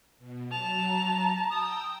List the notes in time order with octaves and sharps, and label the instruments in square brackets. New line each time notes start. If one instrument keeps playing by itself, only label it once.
[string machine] B2
[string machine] F#3 [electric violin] A5 [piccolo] F7
[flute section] A#5
[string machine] G5 E6 [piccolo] D#6